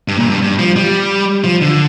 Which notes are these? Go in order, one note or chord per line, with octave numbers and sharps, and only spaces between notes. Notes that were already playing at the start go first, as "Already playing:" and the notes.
G2
A#2
G2
G2
F3
G3
F3
D3